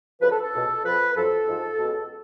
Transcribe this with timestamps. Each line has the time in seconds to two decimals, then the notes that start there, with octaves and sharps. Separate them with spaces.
0.21 D2 C#3 F3 B4
0.31 A4
0.42 A4
0.52 C#2 B2
0.83 F2 F3 B4
1.15 F#2 F3 A4
1.46 G#2 F3
1.79 C#2 B2